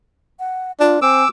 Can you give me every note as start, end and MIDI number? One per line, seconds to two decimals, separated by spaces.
0.39 0.72 78
0.80 0.98 62
0.80 0.98 65
1.02 1.23 60
1.02 1.25 80
1.02 1.28 86
1.02 1.28 88